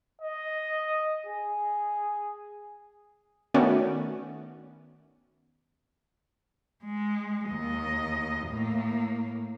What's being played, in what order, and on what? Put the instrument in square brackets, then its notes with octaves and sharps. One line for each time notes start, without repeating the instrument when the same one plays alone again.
[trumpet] D#5
G#4
[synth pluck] D#3 A3 B3 C#4 F#4 D5
[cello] G#3
D#2 D#5
A2 A#3